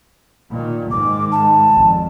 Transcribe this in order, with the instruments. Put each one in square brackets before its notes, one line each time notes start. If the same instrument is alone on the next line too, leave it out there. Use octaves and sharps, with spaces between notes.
[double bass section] A#2 D#3
[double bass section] G#2 D#3 G#3 [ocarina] D6
[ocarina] A5
[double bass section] G#1 F2